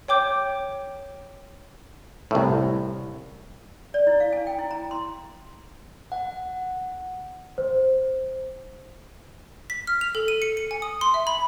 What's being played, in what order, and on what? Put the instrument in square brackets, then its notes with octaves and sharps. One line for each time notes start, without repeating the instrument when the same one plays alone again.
[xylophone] C#5 G5 D6 G6
[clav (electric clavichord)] C2 A2
[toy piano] D5
E4
F5
G#5
G5
E4
A#5
C6
[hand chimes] F#5
[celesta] C5
[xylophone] B6
F6
F7
A4
D#7
C#7
C#7
G#5
D#6
C6
E5
B5